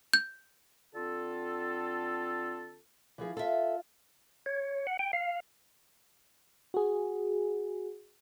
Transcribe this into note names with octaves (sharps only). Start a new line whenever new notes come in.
G6
D3 C4 F4 A4
E3 F3 G#4
F4 A4 E5 F5
C#5
F#5
G5
F5
F#4 G#4